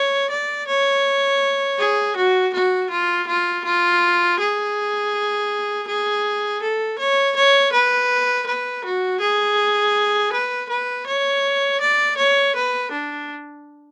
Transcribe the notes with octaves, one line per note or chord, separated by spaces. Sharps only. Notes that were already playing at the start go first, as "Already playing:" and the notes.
Already playing: C#5
D5
C#5
G#4
F#4
F#4
F4
F4
F4
G#4
G#4
A4
C#5
C#5
B4
B4
F#4
G#4
B4
B4
C#5
D5
C#5
B4
D4